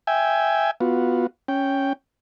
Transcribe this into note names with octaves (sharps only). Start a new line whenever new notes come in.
E5 G5 G#5
B3 F4 F#4
C#4 G5